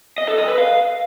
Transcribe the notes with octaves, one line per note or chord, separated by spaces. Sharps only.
D#5
A4
D#5
B4
F5